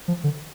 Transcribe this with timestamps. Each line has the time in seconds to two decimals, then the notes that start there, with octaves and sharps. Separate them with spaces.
0.08 F3
0.24 D3